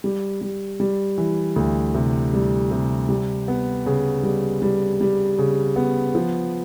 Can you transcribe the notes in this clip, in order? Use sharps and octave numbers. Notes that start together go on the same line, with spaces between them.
G3
G3
G3
E3
D2
C3
G3
C3
G3
B3
C#3
G3
G3
G3
C#3
B3
F3